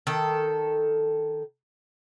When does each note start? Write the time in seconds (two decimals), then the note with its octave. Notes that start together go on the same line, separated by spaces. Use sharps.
0.07 D#3 A4